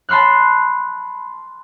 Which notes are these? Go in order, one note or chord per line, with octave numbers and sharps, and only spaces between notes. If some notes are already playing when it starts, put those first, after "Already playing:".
A5 B5 C6 F6 F#6